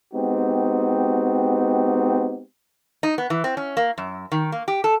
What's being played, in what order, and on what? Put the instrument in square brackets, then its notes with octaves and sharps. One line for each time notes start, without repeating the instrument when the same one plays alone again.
[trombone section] G#3 B3 C4 D#4 F#4 G4
[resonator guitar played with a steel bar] D#4
B3
E3
C4
C#4
A#3
F#2
D#3
A#3
G4
A4